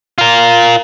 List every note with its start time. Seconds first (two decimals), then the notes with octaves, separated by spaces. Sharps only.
0.18 F4 A#4